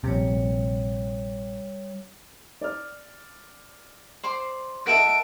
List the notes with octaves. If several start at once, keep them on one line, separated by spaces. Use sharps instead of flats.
A#1 C3 G3 C#5
D5 F6
C5 D5 C6
A4 A#4 D#5 E5 F#5 D7